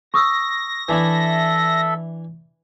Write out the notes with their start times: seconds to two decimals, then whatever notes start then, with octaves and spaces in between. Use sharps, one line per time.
0.14 C#6 D#6 E6 A#6
0.89 E3 D4 E4 A4 E5